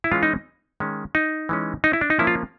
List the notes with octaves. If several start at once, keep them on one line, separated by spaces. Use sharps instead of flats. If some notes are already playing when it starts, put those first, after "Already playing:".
E4
E3 G#3 C#4 F4
D#4
D#3 G#3 C#4
D#4
E3 G#3 C#4
D#4
E4
D4
D#4
F3 A#3 C#4 E4
F4